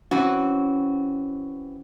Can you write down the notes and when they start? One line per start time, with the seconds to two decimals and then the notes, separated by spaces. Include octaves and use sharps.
0.11 E3 C4 C#4 F#4